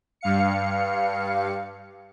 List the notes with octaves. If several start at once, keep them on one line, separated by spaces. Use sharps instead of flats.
G2 F5 C#7